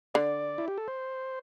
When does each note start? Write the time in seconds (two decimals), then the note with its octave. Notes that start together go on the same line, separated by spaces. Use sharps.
0.14 D3 D5
0.58 E4
0.68 G4
0.78 A4
0.88 C5